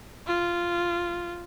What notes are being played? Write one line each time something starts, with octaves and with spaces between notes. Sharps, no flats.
F4